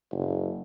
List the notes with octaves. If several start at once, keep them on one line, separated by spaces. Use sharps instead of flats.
F#1